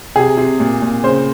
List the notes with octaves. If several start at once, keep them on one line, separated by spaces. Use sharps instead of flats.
C3 G#4
C3
A#2
A#2
C#3 C5